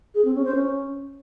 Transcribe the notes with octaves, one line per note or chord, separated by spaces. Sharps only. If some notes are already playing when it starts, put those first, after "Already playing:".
G#4
C4
C#4
C5
C#4